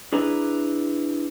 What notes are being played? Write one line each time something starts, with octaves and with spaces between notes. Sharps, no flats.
D4 E4 G#4 B4 A#5